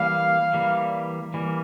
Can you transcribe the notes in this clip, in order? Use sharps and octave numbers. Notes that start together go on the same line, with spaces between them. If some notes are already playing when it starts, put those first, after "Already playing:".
Already playing: E3 G3 A#3 F5
E3 G3 A#3
E3 G3 A#3